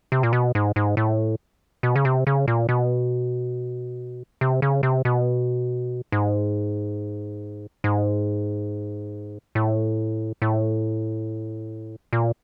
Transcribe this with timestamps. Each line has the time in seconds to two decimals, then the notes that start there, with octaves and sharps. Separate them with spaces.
0.12 C3
0.23 A#2
0.33 B2
0.55 G#2
0.76 G#2
0.97 A2
1.83 B2
1.96 C#3
2.05 C3
2.27 C#3
2.48 A#2
2.69 B2
4.41 C3
4.62 C#3
4.83 C3
5.05 B2
6.12 G#2
7.84 G#2
9.55 A2
10.42 A2
12.13 A#2